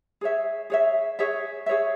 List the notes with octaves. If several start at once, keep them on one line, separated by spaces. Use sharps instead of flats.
G#4 C#5 E5
G#4 C#5 E5
G#4 C#5 E5
G#4 C#5 E5